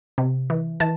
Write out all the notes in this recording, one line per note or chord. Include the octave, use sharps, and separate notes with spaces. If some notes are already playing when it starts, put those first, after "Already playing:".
C3
E3
E3 A5